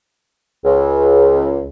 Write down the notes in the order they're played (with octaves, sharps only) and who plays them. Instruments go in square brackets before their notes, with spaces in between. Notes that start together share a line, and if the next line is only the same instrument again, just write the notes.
[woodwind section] C#2